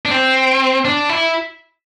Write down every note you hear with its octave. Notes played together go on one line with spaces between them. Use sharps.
D4
C4
D4
E4